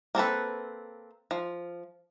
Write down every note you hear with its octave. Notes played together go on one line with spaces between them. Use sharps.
A#3 C4 A4 B4
F3